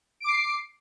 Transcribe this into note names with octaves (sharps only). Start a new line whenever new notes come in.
D6 C7 D7